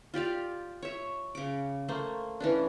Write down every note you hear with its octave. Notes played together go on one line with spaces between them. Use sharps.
F4 G4 D5 F5
C#5 E5
C#3 D6
A3 A#3 C5
E3 C#4 D4